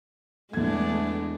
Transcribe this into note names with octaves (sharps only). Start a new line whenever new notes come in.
E2 G#3 A3 B3 D4 G#6